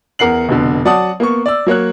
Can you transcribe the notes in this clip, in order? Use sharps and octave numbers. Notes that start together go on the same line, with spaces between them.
E2 A#4 F#5 C7 F#7
F1 B2 D3
F#3 D5 F#5 A5 D#6
A#3 B3 C#6
D5 E6
F#3 A#3 C#5 F#6